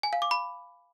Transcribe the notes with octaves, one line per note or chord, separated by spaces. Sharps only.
G#5
F5
D6
B5